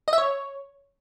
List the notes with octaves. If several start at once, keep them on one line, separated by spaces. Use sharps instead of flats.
D#5
E5
C#5